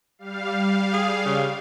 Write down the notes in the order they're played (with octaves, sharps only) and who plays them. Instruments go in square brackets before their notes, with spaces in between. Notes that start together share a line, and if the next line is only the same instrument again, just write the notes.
[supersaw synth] G3 F5
[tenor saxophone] G#4
C#3